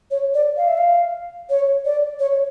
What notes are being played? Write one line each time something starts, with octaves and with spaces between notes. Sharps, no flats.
C#5
D5
F5
E5
F5
C#5
D5
C#5